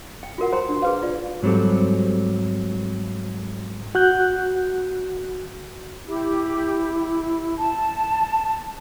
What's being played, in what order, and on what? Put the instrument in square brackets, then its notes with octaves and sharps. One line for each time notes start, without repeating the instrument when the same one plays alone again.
[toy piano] G5
F4 F#4 A#4 F#5
C5 G5 A#5 C6
D4
G#4 B4 F5
F4 D5
[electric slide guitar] G#2 F#3 G3 C4 G4 A4
[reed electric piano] F#4 F#6 G6
[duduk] E4 [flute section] G4
[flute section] A5